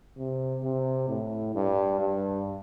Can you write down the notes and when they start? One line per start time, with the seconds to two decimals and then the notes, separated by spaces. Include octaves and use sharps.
0.17 C3
0.63 C3
1.09 A2
1.55 G2
2.00 G2